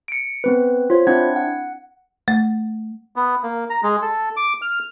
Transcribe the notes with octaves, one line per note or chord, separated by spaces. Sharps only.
C#7 D7
B3 C4 B4
F4 C5 C#5
C4 D4 E4 F#5 G#6
F#5
A3
B3
A#3
A#5
G#3
A4
D6
F6